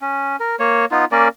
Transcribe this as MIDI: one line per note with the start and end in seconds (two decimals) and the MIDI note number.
0.01 0.36 61
0.40 0.56 70
0.60 0.85 58
0.60 0.85 73
0.91 1.05 59
0.91 1.05 63
0.91 1.05 65
1.12 1.28 58
1.12 1.28 61
1.12 1.28 70
1.12 1.28 74